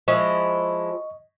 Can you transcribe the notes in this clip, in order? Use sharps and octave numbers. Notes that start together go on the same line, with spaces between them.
F3 G#3 E4 D#5 C#6